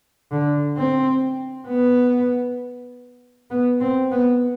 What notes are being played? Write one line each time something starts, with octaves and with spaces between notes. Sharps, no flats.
D3
C4
B3
B3
C4
B3